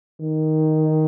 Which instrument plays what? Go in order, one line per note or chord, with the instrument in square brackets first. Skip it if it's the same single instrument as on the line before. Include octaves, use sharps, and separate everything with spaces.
[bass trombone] D#3